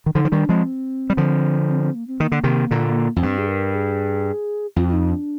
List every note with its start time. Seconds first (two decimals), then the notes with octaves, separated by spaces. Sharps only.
0.06 D#3
0.15 D3 F3 D#4
0.25 F3
0.32 D#3 G3 D4
0.49 F3 G#3 C4
1.10 G3
1.17 D3 F3
1.68 C4
1.82 C4
1.95 A#3
2.07 C4
2.20 D#3 A#3
2.32 D3
2.44 C3 D#3
2.71 A#2 D3
3.16 F2
3.23 G2 C4
3.38 G#4
3.49 A#4
3.74 G#4
4.76 F2 F4
4.87 F4
4.93 D#4
5.10 D4